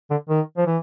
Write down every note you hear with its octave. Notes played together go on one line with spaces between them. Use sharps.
D3
D#3
F3
E3